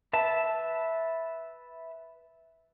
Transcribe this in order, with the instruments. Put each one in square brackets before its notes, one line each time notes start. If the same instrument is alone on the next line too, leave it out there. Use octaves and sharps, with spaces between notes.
[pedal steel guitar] B4 E5 A5